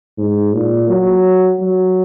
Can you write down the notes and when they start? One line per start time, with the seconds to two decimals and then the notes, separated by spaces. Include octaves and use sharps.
0.18 G#2
0.53 A#2
0.89 F#3
1.61 F#3